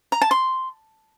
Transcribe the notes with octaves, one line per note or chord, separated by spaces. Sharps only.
A#5
A5
C6